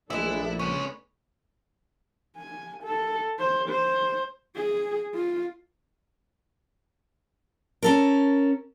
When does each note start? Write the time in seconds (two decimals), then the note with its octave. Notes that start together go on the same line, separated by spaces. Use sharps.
0.10 A#1 E3 G#3 A3 D4 E4 A4
0.59 G#3 B3 C#4
2.36 G#5
2.83 A4
3.39 C5
3.69 C5
4.56 G#4
5.14 F4
7.83 C#4 A4 A#4